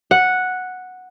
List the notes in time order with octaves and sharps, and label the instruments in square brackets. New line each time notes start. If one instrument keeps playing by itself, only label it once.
[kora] F#5